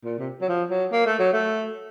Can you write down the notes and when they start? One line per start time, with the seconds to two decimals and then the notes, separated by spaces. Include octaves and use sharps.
0.04 A#2
0.19 C3
0.41 F#3
0.48 F3
0.70 F#3
0.92 A#3
1.06 A3
1.19 F#3
1.33 A3